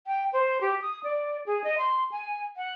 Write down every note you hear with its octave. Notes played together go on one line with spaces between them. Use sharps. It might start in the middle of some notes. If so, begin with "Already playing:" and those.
G5
C5
G4
D#6
D5
G#4
D#5
C6
G#5
F#5